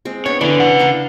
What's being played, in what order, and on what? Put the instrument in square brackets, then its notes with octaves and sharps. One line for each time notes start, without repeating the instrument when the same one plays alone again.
[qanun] G#3 C4
[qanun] B3 D4 G5 [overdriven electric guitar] C#5
[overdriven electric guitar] D3 D4 [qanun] E3 B4
[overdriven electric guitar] C#3 F#5
[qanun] D4 F5 A#5